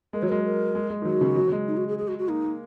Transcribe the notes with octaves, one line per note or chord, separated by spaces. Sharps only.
G#3 A#4
F#3 C#5
G#3 A#4
A#4
G#3
G#3
D#3
F#3 F#4
C#3
F#3
F#3
G#3
D#4
F#4
G#4
G#4
F#4
F#4
A#3 D#4
A#3